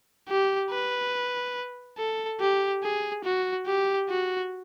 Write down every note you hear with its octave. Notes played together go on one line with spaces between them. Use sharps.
G4
B4
A4
G4
G#4
F#4
G4
F#4